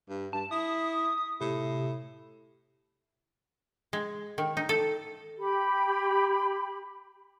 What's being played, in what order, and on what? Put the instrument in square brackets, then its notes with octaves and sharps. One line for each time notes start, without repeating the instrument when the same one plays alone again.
[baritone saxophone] G2
[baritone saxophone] G2 [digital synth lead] A5
[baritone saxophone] E4 [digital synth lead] D#6
[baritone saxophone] A2 [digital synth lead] C3
[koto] G#3
D#3
D#4
A4
[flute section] G4 B5